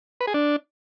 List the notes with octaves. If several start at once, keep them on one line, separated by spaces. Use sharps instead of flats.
B4
G#4
D4